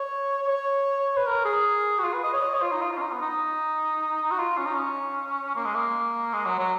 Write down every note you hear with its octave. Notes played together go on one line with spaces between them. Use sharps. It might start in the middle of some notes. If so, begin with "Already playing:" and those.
Already playing: C#5
C#5
B4
A#4
G#4
F#4
F4
B4
D#5
C#5
D#5
C#5
F4
D#4
F4
F4
C#4
D#4
B3
D#4
F#4
F4
C#4
D#4
C#4
A#3
G#3
A#3
G#3
F#3
F#3